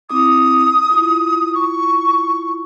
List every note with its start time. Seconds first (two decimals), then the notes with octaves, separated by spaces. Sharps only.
0.10 C4 E4 D6 D#6
0.90 E4 F4
1.55 C#6